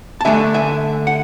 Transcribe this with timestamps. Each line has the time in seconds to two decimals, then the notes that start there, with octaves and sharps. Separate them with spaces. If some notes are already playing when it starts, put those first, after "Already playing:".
0.21 A5
0.25 D3 A3 D4 E5 G#5
0.54 E5 G#5
1.07 F#5